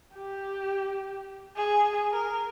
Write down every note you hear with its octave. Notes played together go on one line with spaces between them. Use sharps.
G4
G#4
A#4